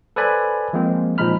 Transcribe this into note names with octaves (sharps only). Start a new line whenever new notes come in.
A4 B4 C5 D5 G#5 B5
F3 G#3 A#3 C4
A#2 F3 G#3 D#4 B5 F6